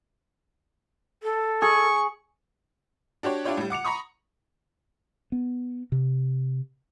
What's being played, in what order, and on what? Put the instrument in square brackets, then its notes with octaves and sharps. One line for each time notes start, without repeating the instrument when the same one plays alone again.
[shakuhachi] A4
[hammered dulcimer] G#4 [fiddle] C#6
[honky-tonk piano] D4 F#4 G4 C#5
D4 E4 F4 G4 C#5 D5
A2 G3
F#5 D6 C#7 F7
A#5 B5 C#6 D#6
[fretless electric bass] B3
C3